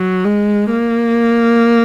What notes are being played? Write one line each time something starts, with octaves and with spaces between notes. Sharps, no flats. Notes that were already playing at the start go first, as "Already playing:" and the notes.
Already playing: F#3
G#3
A#3